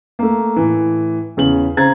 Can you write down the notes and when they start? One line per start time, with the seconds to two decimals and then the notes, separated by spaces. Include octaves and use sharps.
0.19 A3 A#3
0.56 A2 E3
1.37 E2 C#3 C#4 F#7
1.77 C#3 C4 A#5 G#6 A6